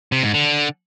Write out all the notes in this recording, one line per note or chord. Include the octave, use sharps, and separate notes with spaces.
C3
G#2
D3